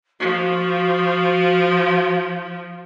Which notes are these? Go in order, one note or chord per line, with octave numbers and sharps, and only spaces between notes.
F3 F#4